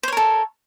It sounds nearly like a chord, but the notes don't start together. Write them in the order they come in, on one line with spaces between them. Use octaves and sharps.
C5 C#5 A#4 A4